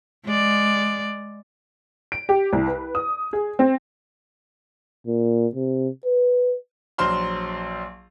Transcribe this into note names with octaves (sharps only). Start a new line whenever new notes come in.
G#3 D5
D7
G4
C2
B4
D#6
G#4
C4
A#2
C3
B4
A#1 F#3 C5 C6 F6